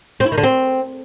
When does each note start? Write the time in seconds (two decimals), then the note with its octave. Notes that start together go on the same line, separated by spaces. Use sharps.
0.20 C4
0.26 E4
0.32 D#3
0.38 D3
0.43 C4